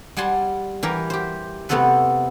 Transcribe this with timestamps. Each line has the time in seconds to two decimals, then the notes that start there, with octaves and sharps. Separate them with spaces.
0.17 G3 F#5 G#5 A5 C6
0.83 E3 G4 A#4
1.10 G4 C5
1.69 C3 A3 B3 C4 A4 B4